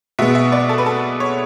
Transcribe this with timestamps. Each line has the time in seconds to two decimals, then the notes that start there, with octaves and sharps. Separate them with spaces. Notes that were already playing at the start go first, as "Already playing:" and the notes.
0.19 B2 G#3 B3 E5
0.35 E5
0.52 D5
0.69 A4
0.78 B4
0.86 A4
1.20 C#5